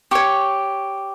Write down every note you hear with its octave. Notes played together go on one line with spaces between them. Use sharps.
G4 C#5 C#6